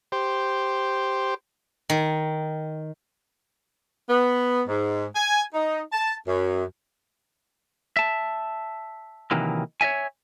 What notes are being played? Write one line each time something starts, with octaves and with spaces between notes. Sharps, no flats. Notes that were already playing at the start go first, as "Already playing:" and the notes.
G4 C5
D#3
B3
G#2
G#5
D#4
A5
F#2
E5 A5
C3 D#3 E3 F#3 A#3
C#5 D#5 E5 G#5